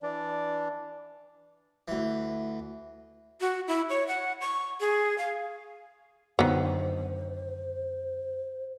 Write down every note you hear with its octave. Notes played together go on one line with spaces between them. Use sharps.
E3 D4 D5
D2 E3
F#4
E4
C#5
F#5
C#6
G#4
F5
F#2 D3 D#3 B3 C5